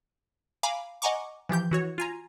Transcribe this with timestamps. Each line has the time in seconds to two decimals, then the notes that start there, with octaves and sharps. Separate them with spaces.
0.63 F5 G#5 A#5 B5 D6
1.02 D#5 F#5 G#5 A#5 C#6 D6
1.49 E3 F3 G4 G6
1.71 E3 F#4 C#5
1.98 F4 G#5 A#5